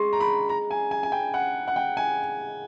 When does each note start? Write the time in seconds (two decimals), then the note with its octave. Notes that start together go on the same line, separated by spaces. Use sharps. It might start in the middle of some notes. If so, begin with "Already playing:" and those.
Already playing: G#3 C6 C#6
0.13 A#5
0.20 B5
0.49 A#5
0.71 G#5
0.91 G#5
1.03 G#5
1.12 G5
1.34 F#5
1.68 F#5
1.76 G5
1.97 G#5